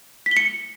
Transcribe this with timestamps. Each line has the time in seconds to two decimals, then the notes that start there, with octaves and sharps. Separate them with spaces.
0.26 B6
0.31 G7
0.37 C#7